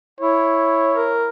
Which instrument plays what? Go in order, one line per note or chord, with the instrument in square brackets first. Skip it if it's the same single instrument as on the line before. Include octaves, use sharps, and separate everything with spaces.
[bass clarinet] E4 [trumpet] C#5
[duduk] A#4